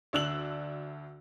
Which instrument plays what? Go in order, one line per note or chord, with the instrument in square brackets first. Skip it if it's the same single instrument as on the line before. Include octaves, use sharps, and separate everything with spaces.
[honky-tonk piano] D2 D4 E6 F#6 F#7